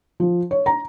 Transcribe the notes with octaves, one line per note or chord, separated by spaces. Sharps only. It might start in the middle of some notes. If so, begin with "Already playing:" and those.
F3
C#5
A#5